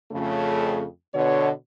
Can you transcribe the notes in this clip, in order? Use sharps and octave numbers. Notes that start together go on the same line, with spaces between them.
F2 C#3 A3
B2 D3 C#5